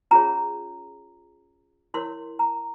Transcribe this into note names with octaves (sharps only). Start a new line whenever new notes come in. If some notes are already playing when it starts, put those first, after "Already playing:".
C#4 F4 G#4 C#5 A#5
E4 A#4 C#5 C6
A#5